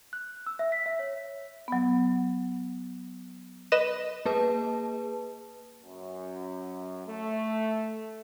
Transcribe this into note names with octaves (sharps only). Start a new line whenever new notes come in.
F#6
E6
E5
B6
E5
C#5
F#3 B3
B4 D#5 E7
A#3 G#4 B4 A5
F#2
A3